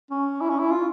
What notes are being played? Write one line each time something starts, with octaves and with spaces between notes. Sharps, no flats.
C#4
E4
C#4
E4
F4